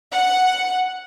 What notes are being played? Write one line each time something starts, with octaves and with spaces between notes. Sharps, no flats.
F#5